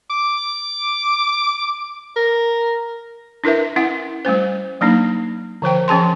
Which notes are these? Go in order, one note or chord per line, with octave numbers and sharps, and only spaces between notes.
D6
A#4
D4 E4 A#4 B4 E5
C#4 E4 F#5
G3 A3 C#4 C5
F#3 A#3 D4 D#4
D3 F3 C5 G5
F3 C#4 G#4 A5 C6